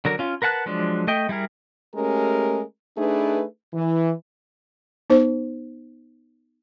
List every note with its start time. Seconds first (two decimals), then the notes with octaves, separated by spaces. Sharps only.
0.05 D3 F#3 A#4
0.19 C#4 F4
0.42 A#4 B4 F#5 A5 F#6
0.66 F3 F#3 G#3 D4
1.07 A3 D#5 G5
1.29 G3 E4 G#4 A#4
1.95 G#3 A3 C#4 G4 A#4
2.97 A3 D4 D#4 G#4 B4
3.73 E3
5.10 B3 D#4 C5